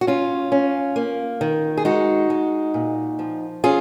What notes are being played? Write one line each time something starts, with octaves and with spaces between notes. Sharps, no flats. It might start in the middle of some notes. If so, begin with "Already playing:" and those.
F#4
C#4 F4
C#4
A#3
D#3
G#4
G#3 D#4 F#4
G#3
A#2
F3
C#4 F4 G#4